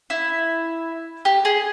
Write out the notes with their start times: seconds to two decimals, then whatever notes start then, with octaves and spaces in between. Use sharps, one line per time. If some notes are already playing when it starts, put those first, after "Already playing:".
0.10 E4
1.25 G4
1.45 G#4